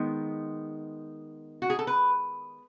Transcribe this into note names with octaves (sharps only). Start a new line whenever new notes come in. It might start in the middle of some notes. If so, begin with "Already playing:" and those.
Already playing: D#3 G#3 B3
F#4
G#4
A4
B4